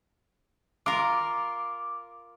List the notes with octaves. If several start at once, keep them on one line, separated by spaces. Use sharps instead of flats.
F4 A#4 D6